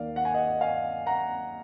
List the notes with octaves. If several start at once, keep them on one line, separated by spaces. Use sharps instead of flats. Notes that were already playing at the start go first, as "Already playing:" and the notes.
Already playing: D#2 D#3 A#3 D5 F5
F#5
G#5
D#5 F#5
F5 G#5
F#5 A#5